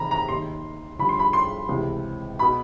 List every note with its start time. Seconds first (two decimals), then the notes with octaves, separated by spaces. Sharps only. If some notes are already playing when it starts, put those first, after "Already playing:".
Already playing: E2 C3 D#3 A#5 B5
0.11 A#5
0.28 D#2 D#3 C6
0.99 G2 D3 F3 B5
1.09 C6
1.19 B5
1.33 C6
1.69 C#2 C3 E3
2.39 B2 B5